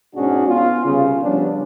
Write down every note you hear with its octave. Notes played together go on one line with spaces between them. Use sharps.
G#2 B2 C#4 D4 F#4 G#4
B3 F4
C2 C#3
C#3 F3 G3 B3 C#4 D4